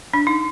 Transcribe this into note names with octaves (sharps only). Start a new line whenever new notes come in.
D4
D#4